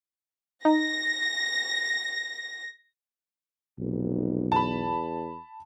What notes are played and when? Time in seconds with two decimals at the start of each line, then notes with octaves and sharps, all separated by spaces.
0.65 D#4 A#6
3.78 F1 B1
4.52 E2 A5 B5